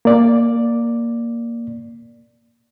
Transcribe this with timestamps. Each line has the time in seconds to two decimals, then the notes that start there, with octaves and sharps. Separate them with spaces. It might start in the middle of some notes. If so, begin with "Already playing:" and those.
0.05 A#3 D5